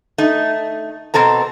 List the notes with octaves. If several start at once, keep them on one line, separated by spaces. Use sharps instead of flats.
A3 D#4
B2 C4 A4 A#5